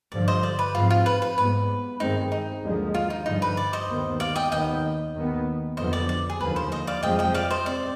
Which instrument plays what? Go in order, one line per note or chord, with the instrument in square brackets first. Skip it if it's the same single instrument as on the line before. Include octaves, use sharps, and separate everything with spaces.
[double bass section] G2 D3 F3 [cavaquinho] D5
[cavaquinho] C5 D#5
D5
B4
[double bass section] G#2 F3 C4 [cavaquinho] F4
[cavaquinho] F4
B4
B4
[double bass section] G#2 G3 B3 [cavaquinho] B4
[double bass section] G2 D#3 G#3 C4 [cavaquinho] D#4
[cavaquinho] D#4
[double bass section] D#2 D3 F3 G#3
[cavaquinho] F4
D#4
[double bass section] G2 D3 F3 [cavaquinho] D#4
[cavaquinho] B4
D5
C5 D#5
[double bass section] D#2 D#3 B3
[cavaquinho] D5 F5
D#5 G5
[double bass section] D#2 D#3 B3 [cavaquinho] D#5 G5
[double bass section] D#2 D#3 B3
[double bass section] F2 D3 F3 B3 [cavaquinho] C5 D#5
[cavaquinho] D5
D5
G#4
[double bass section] D#2 D3 F3 [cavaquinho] B4
[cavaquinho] C5
C5 D#5
D5 F5
[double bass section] F2 C3 F3 G#3 [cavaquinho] D#5 G5
[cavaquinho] D#5 G5
D5 F5
C5 D#5
[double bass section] C4 [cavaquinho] D5